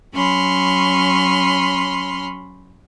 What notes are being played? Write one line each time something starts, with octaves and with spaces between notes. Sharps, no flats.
F#3 C#4 B5 C6 F6